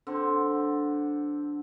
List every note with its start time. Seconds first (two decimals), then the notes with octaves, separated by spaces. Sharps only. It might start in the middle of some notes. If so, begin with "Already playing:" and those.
0.07 D3 C4 A4